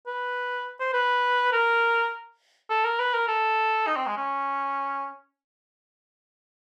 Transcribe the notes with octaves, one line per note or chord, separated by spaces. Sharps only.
B4
C5
B4
A#4
A4
A#4
B4
A#4
A4
D#4
C4
G#3
C#4